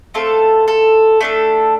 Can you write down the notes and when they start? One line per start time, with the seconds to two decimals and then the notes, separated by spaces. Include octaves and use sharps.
0.14 A3 C4 F4 A4
0.68 A4
1.21 A3 D4 A4